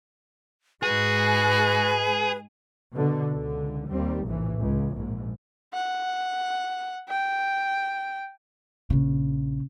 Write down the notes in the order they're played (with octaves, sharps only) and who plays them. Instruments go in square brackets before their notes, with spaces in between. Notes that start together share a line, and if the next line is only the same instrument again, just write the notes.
[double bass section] G#2 G#3 [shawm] F#4 [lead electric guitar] G#4 [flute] B4
[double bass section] B2 D3
C#2 D3
D#2 G3 C4
F1 A#1 A2 E3
C#2
A#1 G#2
[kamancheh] F#5
G5
[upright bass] A#1 C#3